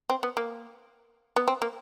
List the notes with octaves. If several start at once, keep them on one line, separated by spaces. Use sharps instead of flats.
C4
B3
A#3
B3
C4
A#3